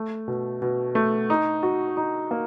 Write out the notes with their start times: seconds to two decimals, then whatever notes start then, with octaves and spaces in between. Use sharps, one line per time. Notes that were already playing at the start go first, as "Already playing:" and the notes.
Already playing: A3
0.28 B2
0.62 B2
0.95 A3
1.30 D#4
1.63 F#4
1.97 D#4
2.31 A#3